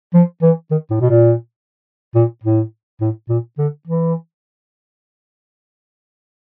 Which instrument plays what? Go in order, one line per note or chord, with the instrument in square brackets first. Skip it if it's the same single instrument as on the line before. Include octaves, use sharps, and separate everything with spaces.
[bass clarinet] F3
E3
D#3
A2
B2
A#2
A#2
A2
A2
A#2
D3
E3